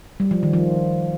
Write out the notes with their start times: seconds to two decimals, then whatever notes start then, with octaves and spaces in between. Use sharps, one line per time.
0.20 G3
0.31 F3
0.43 D#3
0.53 F3